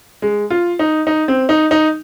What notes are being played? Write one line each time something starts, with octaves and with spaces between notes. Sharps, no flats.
G#3
F4
D#4
D#4
C4
D#4
D#4